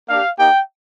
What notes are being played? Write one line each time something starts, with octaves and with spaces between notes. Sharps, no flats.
A#3 D4 G4 F5
A#3 D#4 G4 G5